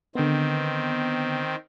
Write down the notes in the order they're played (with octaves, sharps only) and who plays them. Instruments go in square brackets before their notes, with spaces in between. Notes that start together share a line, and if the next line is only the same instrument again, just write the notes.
[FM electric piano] D3 B3 [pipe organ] D#3 C4